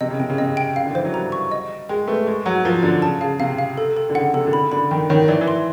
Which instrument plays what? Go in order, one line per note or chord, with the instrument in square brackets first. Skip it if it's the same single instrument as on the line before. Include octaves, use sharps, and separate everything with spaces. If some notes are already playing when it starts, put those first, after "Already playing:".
[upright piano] C3 [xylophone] D#5
[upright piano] C#3
[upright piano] C3 [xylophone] G5
[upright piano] C#3
[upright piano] C3 [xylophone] D#5
[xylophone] G5
[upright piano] C#3 [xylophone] F5
[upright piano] D3
[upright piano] E3 [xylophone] C5
[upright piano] F#3
[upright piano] G3 [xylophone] A#5
[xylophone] C#6
D#5
D#5
[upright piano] G#3 [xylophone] G5
[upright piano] A3 [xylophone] B4
[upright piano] G#3 [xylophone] C#6
[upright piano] F#3 [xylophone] F#5
[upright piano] F3 [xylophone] A#5
[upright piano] D3 [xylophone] A#5
[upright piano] C#3 [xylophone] A5
[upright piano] C#3 [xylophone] F5
[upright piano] C3 [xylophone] F5
[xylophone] F5
A4
A4
[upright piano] D3
[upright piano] C#3 [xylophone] F#5
[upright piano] C3 [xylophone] A4
[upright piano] D3
[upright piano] C#3 [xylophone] B5
[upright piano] D3 [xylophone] B5
[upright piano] D#3 [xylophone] G5
[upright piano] D#3 [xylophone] C#5
[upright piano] E3 [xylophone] D5
[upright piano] E3
[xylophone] C6